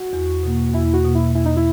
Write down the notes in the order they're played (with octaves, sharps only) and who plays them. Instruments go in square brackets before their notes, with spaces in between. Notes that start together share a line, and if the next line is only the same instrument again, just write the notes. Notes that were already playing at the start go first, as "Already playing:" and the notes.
Already playing: [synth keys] F#4
[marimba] E2
B2 A#3
[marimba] E2 [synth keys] E4
[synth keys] F#4
[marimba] B2 A#3
[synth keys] E4
[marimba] E2 [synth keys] E4
[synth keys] D#4
E4